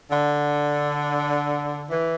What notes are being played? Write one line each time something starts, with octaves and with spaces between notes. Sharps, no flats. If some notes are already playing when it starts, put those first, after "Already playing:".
D3
E3